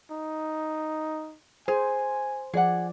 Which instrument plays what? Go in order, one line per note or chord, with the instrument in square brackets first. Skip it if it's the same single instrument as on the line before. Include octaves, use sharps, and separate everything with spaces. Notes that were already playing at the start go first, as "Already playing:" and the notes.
[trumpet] D#4
[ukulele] G#4 [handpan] C5 [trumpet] G#5
[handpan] F3 D5 [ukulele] G#4 F#5